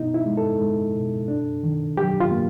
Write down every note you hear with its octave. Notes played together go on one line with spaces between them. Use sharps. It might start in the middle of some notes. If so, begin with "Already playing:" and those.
Already playing: B2 B3 D#4
E4
G#3
A4
G#3
B2
D4
D#3
F#3 G4
F4
A#3